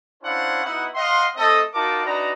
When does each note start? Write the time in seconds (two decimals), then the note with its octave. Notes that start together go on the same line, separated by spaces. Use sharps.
0.23 C#4 D4 E4 C5 F5 F#5
0.64 B3 D#4 E4 F#4 E5 F#5
0.95 D#5 F5 F#5 C6
1.36 A3 C4 A4 D#5
1.74 D#4 F4 F#4 A#4 A5 D6
2.05 D4 D#4 F#4 B4 A#5